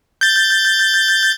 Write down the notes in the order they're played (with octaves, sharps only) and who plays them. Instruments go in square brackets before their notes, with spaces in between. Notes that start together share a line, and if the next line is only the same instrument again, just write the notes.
[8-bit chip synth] G6 A6